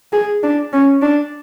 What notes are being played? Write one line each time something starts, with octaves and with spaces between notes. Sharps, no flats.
G#4
D4
C#4
D4